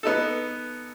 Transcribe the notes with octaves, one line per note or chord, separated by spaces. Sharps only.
B3 D#4 A4